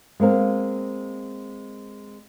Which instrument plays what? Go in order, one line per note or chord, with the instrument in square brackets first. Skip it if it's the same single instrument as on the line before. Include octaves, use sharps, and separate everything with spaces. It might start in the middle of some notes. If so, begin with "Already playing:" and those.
[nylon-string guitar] G#3 A#3 C4 A#4